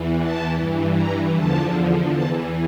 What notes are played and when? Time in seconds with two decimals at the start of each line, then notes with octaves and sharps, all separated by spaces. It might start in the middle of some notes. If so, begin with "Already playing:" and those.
Already playing: E2 E3
0.20 A5
0.59 G2 E3
0.97 A#5
1.35 E2 D3 F3 A5
2.12 E2 E3 A5